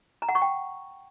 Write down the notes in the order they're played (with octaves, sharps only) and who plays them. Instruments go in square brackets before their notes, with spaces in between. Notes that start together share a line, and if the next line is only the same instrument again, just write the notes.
[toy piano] A#5
F#5
C#6
G5